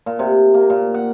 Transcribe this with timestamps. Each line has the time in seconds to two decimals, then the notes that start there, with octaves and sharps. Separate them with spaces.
0.06 A#2
0.19 C3
0.54 A#3
0.70 A#2
0.94 F#5